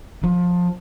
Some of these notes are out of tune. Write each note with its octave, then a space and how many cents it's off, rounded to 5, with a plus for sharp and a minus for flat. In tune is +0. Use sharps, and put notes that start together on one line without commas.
F3 +20